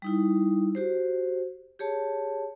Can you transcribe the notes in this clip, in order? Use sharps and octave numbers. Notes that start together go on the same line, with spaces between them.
G3 D#4 E4
F#4 G4 C5
G4 G#4 C#5 A5